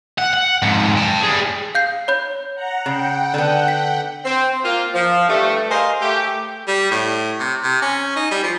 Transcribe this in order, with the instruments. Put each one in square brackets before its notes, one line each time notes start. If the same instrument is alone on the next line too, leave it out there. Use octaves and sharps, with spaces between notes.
[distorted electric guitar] F#5
F#5
F2 G#2
G5 A5
G3 G#4
[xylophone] F5 G6 C7
C#5 B5 G6
[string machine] F#5 A#5
[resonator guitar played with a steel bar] C#3 [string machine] F#5 G5
[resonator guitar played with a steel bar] D3 B3
[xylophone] B6
[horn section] C4
A#3 F4
F3
G2 A3
G#4 A#4 C5 D#5 F5
A3 G4
[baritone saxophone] G3
A2
C3
C3
C#4
D#4
G3
F3